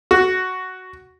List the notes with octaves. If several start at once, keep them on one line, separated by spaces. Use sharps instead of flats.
F#4